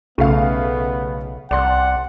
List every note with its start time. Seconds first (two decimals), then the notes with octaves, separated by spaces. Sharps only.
0.18 B1 C#3 A3 B3 F5
1.51 C2 D5 F#5 C6